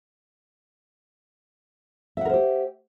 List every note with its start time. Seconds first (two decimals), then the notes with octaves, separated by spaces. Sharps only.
2.17 E5
2.21 F#5
2.25 A#4
2.29 C5
2.34 G4